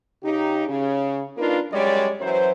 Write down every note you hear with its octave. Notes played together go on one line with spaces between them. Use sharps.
C#3 D#4 G4
C#3
A#3 D4 D#4 F4 A#4 B4
F#2 G3 G#3 C#5 D5
F#2 E3 F#3 C5